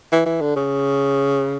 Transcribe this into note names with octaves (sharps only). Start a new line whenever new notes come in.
E3
E3
D3
C#3